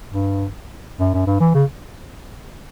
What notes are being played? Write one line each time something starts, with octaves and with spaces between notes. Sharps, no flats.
G2
F#2
F#2
G2
E3
C#3